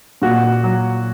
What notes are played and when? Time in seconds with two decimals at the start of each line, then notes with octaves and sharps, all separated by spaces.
0.22 A#2 F#4
0.64 F#3